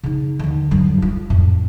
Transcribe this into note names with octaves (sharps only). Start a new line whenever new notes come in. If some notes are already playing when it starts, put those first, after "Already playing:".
C#3 D#4
D#2 D3
G2 F#3
F4
F2 A2